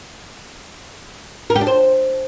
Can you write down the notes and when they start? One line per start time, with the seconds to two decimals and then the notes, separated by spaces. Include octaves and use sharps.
1.50 A#4
1.56 G4
1.61 D4
1.67 C5